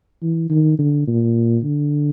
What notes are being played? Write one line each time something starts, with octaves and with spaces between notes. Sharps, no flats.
E3
D#3
D3
A#2
D3